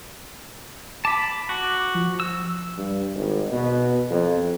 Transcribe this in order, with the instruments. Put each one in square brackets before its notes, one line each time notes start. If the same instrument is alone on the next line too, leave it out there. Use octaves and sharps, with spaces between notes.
[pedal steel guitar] A5 B5 [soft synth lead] D6
[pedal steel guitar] F#4
[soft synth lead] F3
[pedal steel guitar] E6
[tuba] G2
G#1
B2
F2